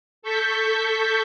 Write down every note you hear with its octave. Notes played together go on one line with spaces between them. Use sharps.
A4 C#6 G6 B6